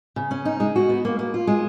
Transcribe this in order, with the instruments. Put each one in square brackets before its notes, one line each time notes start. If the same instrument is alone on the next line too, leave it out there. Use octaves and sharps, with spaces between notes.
[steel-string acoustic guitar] C#3
C#4
D#4
G#3
F#4
B3
A#3
A#3
F4
G#3